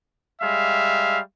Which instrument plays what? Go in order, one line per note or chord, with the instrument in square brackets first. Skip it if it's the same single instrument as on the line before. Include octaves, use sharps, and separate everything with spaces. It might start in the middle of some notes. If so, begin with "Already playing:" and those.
[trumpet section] G3 G#3 E5 F5